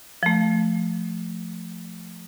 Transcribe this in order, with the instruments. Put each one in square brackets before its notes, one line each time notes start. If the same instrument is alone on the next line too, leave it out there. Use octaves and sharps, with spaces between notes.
[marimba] F3 A3